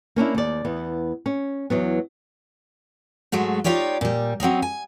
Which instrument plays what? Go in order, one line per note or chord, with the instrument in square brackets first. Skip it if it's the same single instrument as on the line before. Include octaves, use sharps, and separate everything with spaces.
[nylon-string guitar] A#3 C#4 D4 E4
D#2 D5
E2 B3
C#4
E2 F#3 B3
[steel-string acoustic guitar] G#2 F#3 G#3 A3
D#4 F4 G4 C#5 D5
A#2 G3
F#3 C4 C#4 D#4
G#5